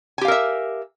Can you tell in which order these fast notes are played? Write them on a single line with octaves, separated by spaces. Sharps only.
G#5 G4 F5 A#4 E5